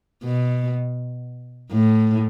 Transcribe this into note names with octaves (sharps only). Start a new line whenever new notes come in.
B2
A2